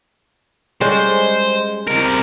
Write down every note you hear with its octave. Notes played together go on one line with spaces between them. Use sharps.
G3 G#3 C#4 C5
C3 A#4